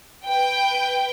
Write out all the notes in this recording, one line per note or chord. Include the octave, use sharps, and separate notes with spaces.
B4 G5